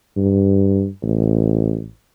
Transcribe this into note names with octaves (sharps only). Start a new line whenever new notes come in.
G2
A1